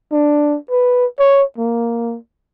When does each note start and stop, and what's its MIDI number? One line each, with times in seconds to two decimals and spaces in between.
0.12 0.57 62
0.70 1.05 71
1.19 1.43 73
1.58 2.17 58